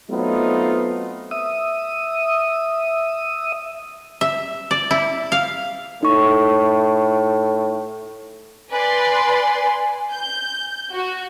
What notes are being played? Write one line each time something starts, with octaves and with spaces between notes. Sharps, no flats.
F#3 A3 B3 C4 D#4 F4
E5 D#6
E5
D5
E4
F5
A2 D#4 C#6
B4 D5 G#5 C6
G6
F#4